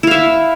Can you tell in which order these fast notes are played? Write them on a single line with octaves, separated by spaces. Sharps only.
E4 F5 E5